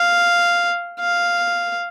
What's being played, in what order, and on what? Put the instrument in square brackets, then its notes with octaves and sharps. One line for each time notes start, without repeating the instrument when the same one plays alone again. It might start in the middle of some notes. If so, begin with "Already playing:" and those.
Already playing: [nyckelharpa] F5
F5